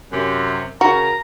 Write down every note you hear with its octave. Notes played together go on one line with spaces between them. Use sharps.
F#2 C3
C#3 F#4 A#4 A#5